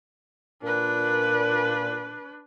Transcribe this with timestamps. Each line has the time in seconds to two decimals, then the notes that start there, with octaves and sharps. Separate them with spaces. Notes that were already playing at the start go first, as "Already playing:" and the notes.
0.62 A#2 D4 B4